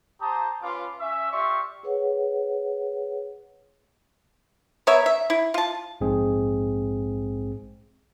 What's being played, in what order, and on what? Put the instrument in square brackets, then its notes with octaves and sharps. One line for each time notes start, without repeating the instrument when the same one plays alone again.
[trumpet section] G4 C5 A5 A#5 D#6
C#4 F4 B4 F5 D6
C#4 E5
F4 G4 D5 E5 C6 C#6
[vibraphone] G#4 B4 C#5 F#5
[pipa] B3 A#4 C#5 E5
E5
E4
F4 A5
[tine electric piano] A#1 G#2 G#3 C4 G#4